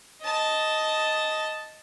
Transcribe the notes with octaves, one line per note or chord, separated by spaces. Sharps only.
D#5 A5